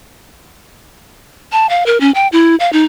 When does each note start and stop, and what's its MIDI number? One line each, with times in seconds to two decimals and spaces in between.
1.52 1.69 81
1.69 1.84 77
1.86 1.98 70
2.01 2.11 61
2.15 2.28 79
2.32 2.56 64
2.60 2.72 77
2.73 2.84 63